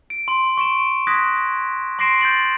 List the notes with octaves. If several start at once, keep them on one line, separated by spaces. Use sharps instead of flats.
D7
C6
C#6 D7 E7
C6 D#6 F#6 G#6 A#6 B6
C6 D6 A#6 C7 D7 E7
G6 A6 F#7